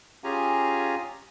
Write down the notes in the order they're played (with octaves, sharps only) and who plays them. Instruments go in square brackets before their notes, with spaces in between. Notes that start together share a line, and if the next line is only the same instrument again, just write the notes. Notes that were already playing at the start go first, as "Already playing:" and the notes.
[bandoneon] C#4 F4 G4 G#4 G#5 A#5